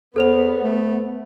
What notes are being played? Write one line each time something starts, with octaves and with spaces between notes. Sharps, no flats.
E2 B3 A4 C5 F7
A3